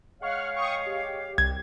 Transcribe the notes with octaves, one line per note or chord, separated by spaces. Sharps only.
G#3 C#5 F5 F#5 C#6 F6
G5 C#6 D#6
G4
C2 G#6